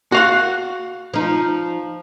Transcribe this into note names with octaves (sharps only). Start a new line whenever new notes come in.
F#4 F5 F#5
F3 D#4